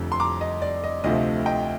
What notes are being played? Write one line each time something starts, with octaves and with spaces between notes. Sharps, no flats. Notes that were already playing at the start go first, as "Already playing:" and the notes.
Already playing: F1 F2 D3
C6
A#5 D6
D#5
D5
D#5
D2 C3 F3 A3 D#5
D#5 G5